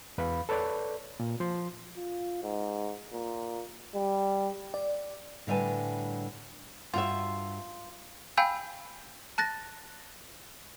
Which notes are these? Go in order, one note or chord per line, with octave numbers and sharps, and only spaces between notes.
E2 B4 F5 B5
A4 B4 C#5 D5
A#2
F3 C6
F4
G#2
A#2
G3
D5
A2 D3 G3 B4 G#5 A5
G2 F4 F#4 E5
F5 G5 G#5 B5 E6 G6
A5 F#6 A6 A#6